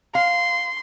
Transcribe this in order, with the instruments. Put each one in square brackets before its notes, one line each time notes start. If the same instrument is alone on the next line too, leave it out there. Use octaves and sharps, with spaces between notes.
[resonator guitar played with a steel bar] F5 [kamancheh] C6